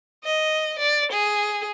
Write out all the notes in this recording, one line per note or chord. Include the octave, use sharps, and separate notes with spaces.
D#5
D5
G#4